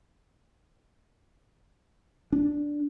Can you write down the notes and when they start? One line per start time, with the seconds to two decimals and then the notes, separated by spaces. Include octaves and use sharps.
2.32 D4